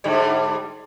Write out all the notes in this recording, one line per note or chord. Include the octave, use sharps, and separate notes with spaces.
G#2 D3 G3